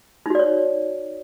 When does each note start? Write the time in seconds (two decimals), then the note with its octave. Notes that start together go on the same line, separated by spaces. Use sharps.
0.26 D#4
0.30 F#4
0.35 D5
0.39 C#5